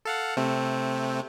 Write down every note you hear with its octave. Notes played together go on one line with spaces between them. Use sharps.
A4 F5 F#5
C3 A3 C4